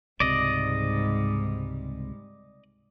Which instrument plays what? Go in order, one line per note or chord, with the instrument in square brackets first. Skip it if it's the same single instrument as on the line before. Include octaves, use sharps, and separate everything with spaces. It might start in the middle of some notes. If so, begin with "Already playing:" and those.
[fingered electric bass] C#2 C3 [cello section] G#2 G3 G#3 [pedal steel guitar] D5 D#5